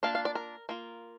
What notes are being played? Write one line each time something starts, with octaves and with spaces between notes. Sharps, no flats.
A#3 D4 F4 F5
F5
D5
A#4
A#3 F4